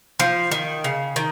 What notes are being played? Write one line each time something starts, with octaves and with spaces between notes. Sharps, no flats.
F3
D#3
C#3
D#3